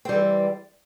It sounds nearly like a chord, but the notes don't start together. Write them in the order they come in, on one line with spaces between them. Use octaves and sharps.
C4 G3 E3